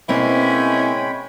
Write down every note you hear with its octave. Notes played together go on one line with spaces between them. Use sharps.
B2 G#3 A#3 C4 C#4 E4 G5 B5